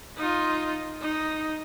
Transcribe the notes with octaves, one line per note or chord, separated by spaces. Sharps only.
D#4 F4
D#4